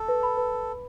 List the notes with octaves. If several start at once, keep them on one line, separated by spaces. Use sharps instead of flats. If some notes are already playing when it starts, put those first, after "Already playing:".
Already playing: A4
B4
B5
B4